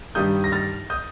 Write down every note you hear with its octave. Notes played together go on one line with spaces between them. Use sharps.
G2 D#3 G3 D#6 G6
A#6
F6 A6
D#6 G6